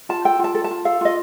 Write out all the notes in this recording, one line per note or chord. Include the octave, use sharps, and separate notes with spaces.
F4 A5
A4 G5
F4 A5
A4
A5
F4
A4 F5
F4 D#5